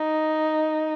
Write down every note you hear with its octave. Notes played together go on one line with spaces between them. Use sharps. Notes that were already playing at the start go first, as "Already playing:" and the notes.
Already playing: D#4